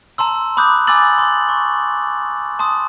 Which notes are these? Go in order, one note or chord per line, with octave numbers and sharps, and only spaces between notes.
A5 A#5 C6 E6
B5 D6 D#6 F#6 G6
G#5 B5 D6 E6 A6 F#7
C6
C#6
A5 C6 D#6